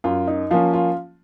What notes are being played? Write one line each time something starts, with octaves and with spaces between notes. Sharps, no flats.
F#2 F4
D#4
F3 A#3 C#4 F4
F4